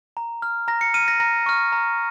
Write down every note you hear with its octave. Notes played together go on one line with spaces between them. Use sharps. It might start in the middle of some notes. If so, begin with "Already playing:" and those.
A#5
F6
A#5 A#6
C#7
F6 D#7
A#6
A#5 A#6
C#6 F6
A#5